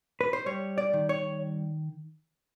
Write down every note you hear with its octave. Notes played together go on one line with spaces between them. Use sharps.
B4
C5
G3 C#5
D5
D#3
C#5